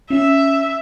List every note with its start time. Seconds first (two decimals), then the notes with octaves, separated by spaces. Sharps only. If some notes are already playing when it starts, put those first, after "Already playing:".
0.10 C#4 E5